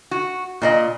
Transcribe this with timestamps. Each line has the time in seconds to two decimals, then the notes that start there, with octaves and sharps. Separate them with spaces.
0.11 F#4
0.62 A#2 D5 D#5